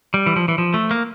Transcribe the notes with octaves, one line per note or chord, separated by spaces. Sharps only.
G3
E3
F3
E3
F3
A3
A#3